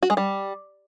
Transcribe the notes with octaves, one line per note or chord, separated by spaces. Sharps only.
F#4
G#3
G3